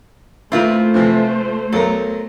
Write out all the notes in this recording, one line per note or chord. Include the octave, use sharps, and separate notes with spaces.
A#2 A3 C4 E4 F4 B4 C5
C3 E3 F3
B1 F#3 A4 A#4